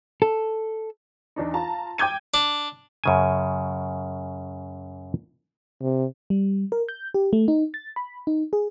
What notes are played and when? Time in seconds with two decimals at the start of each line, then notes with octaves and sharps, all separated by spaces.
0.22 A4
1.36 E2 D4 D#4
1.54 F4 A5 A#5
1.98 G5 D6 G6 G#6 D#7
2.34 D4
3.04 F#2 C#3 G#5
5.81 C3
6.30 G3
6.72 A#4
6.89 G6
7.14 G4
7.33 A3
7.48 D#4
7.74 A6
7.96 B5
8.27 D#4
8.53 G#4